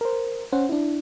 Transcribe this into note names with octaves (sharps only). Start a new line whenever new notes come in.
A#4 C5
C#4 C5 F#5
D4 E4